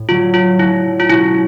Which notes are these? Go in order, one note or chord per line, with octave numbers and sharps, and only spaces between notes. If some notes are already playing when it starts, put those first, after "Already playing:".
Already playing: A2
D3 F#3 A3 F4
F4
D3 F#3 A3 E4
F4
B2 G#3 C#4 E4 F#4